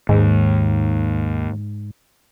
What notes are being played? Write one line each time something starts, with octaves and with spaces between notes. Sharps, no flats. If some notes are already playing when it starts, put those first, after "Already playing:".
D#2 G#2